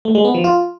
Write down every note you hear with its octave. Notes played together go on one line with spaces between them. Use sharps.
A3
G#3
B3
F3
F4